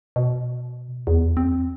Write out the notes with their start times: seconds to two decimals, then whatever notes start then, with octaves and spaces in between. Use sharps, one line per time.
0.16 B2
1.07 E2
1.37 C4